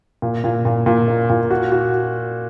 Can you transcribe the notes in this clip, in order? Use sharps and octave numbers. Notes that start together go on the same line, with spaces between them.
A#2
A#2
A#2
A#2
A#3
A#2
F#4
F#4